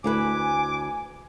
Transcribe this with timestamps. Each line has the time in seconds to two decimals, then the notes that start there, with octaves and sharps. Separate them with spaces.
0.04 D2 E4 B4 G#5 D6